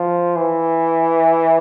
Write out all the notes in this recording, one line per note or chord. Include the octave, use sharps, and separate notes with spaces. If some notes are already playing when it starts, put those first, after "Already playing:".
Already playing: F3
E3